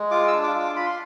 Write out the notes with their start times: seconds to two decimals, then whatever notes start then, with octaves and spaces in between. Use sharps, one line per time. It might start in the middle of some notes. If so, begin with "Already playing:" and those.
Already playing: G#3
0.11 F4 D6
0.28 E6
0.33 D4
0.43 D6
0.55 F4
0.60 D6
0.75 F4 B5
0.86 C6